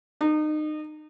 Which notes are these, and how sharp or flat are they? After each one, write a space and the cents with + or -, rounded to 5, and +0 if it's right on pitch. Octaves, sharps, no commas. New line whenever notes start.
D#4 -30